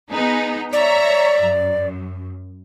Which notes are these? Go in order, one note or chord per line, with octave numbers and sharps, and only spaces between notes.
B3 D#4 G#4
C#5 D5 E5 A#5
F#2